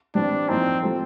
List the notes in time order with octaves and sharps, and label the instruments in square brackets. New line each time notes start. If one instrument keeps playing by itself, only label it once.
[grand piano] A2 E3 G3 C4 [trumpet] D4
[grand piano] A2 F3 A#3 D#4 [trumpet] C4
[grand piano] G3 C4 F4 A4